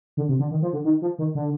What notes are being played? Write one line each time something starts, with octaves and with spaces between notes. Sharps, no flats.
D3
C3
D3
D#3
F3
D3
D#3
F3
D#3
D3